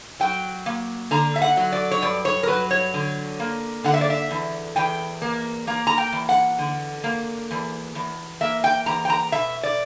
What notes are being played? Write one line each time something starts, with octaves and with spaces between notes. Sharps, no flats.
F#3 G5
A#3
D3 A#5
E5
F#5
F#3
D5
C#5
G2 D5
C#5
A#4
F#3 B4
C#5
D3
A#3
D3 F#5
E5
D5
E5
E2
E2 G5
A#3
A#3 A#5
A#5
G5
E2
F#5
D3
A#3
E2
E2
A#3 E5
G5
E2 A#5
G5
A#5
B2 E5
D5